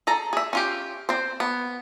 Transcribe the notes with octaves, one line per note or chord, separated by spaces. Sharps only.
G#4 A4 A#5
G#4 E5
C#4 F4 G4
C4 C5
B3